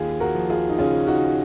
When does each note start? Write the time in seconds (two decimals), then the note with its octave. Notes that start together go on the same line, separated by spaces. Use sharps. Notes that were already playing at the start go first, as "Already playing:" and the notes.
Already playing: D#2 F4 G#4
0.20 F#4 A#4
0.35 F3
0.50 F4 G#4
0.69 D#4
0.78 C#3 C#4 F4
1.07 D#4 F#4